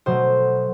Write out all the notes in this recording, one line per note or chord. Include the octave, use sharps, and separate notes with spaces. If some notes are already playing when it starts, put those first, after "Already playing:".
B2 F#3 A3 C5